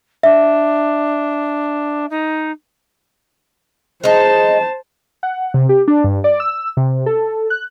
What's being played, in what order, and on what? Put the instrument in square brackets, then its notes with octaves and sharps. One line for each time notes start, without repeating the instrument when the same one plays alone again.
[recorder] D4 [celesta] E5
[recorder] D#4
[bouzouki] G#3 D#4 [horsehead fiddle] C5 A5
[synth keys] F#5
C3
G4
D4
G2
D5
E6
C3
A4
F#6